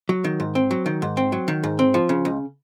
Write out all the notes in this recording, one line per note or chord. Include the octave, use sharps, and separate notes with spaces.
F#3
D#3
G#2
C4
F#3
D#3
G#2
C4
F#3
D#3
G#2
C4
F3
C#3
C#2